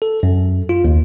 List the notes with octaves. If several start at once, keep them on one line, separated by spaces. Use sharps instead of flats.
A4
F#2
F4
D#2